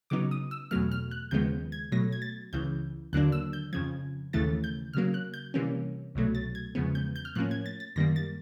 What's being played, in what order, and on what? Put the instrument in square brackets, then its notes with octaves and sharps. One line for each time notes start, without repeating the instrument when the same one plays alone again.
[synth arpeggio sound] C#3 F#3 B3 D#4 D6
D#6
E6
E2 B2 F#3 A3 F6
F6
F#6
D#2 C#3 F3 G#3 B3 G6
G#6
B2 F#3 A3 A#6
G#6
A6
C#2 C#3 E3 G6
D#2 D3 F#3 A#3 D4 F#6
E6
G6
F2 C#3 F3 G#6
D#2 C#3 E3 A3 A6
G6
C#3 F#3 A#3 F6
F#6
G6
C3 E3 G3 A#3 C#4
C2 B2 F#3 A3
A6
G#6
E2 C#3 F3 G#3 B3
G6
G6
F6
A2 F3 A#3 C#4 F#6
G#6
A6
A6
F#2 D#3 G3 A#3 A#6
A6